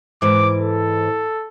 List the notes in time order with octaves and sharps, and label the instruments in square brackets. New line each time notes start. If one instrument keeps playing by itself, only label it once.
[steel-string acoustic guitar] G#2 E3 [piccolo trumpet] D6
[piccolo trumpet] A4